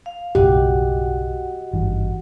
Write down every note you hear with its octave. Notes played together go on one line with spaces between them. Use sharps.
F5
F#1 B1 G#2 F#4 G4 D#5 F#5
G#1 G2 E3